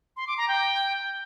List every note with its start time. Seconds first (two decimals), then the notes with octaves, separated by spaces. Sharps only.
0.17 C6
0.27 D6
0.38 A#5
0.48 G5